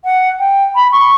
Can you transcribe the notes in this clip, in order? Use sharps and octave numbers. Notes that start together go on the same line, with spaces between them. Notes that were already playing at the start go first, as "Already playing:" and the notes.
F#5
G5
B5
C#6